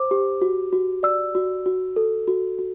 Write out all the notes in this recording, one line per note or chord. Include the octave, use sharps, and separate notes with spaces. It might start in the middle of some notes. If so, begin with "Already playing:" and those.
Already playing: C5 D6
G4
F#4
F#4
D5 E6
F#4
F#4
A4
F#4
F#4